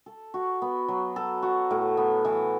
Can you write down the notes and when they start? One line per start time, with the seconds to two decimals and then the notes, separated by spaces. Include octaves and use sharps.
0.06 A4
0.34 F#4
0.62 B3
0.88 F#3
1.16 A4
1.42 F#4
1.71 A2
1.97 B3
2.25 E3